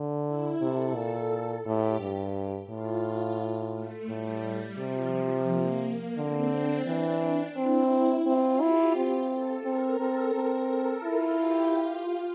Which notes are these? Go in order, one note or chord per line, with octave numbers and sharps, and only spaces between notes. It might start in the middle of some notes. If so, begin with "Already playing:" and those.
Already playing: D3
E4
C3 A4
A#2
A4
A2 G4
G2
A2 F4
A3
A2 G3
G3
C3 F3
F3
A#3
A#3
D3 C4
D4
E3 D4
C4 E4
C4 F4
E4 G4
C4
A4
C4 A#4
C4 A4
C4 A#4
A4
E4 F4
G4
F4